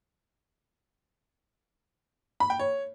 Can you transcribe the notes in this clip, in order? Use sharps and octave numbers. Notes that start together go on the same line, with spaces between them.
B5
G5
C#5